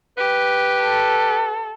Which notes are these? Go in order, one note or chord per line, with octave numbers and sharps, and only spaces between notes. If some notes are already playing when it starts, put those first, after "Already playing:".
G4 B4
A4